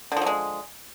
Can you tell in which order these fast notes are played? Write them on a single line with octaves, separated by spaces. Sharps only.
D3 F3 F#3 G#3